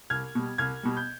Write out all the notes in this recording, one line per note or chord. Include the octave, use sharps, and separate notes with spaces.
C2 F6 G#6
B2 G3
C2 F6 G#6
B2 G3
G6